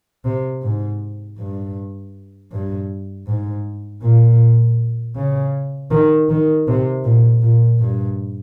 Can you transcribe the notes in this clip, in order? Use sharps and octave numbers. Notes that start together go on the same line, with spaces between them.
C3
G#2
G2
G2
G#2
A#2
C#3
D#3
D#3
C3
A#2
A#2
G2